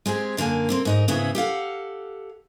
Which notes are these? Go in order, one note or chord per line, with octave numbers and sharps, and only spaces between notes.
G#3 C4 G4 G#4
F#2 D3 A#3 F5 G#5
C3 A#3 C4
G#2 D#4 A#4
G#2 C#3 B3 E4 G#4
G4 A4 F5 F#5